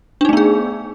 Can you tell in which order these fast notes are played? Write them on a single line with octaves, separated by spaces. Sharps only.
D4 D#4 A3 B3 G#4